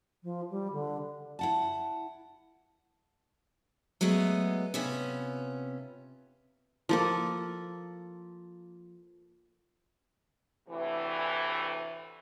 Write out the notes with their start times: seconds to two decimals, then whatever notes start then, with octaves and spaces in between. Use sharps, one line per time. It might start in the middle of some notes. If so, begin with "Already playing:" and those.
0.23 F3
0.50 G3
0.73 D3
1.39 E4 F#5 A5
4.01 F#3 G#3 A3 B3
4.74 C3 B3 C#4 F4
6.89 F3 A#3 A4
10.68 D2 A2 C3 E3